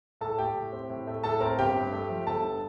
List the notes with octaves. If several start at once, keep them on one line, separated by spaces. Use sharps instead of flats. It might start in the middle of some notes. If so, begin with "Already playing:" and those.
A2 A4 A5
A3 G4 G5
A2
C4
A2
A3
A2 A4 A5
C4 A#4 A#5
G1 G4 G5
G2
A3
F3
G1 A4 A5
G2